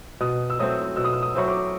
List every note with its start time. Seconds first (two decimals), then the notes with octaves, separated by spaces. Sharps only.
0.21 B2 D#6
0.50 E6
0.59 F#3 A3 C4 D#6
0.96 B2 E6
1.04 D#6
1.13 E6
1.22 D#6
1.35 F#3 A3 C4 C#6
1.48 D6